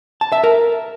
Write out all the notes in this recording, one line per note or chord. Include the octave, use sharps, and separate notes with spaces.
A5
E5
A#4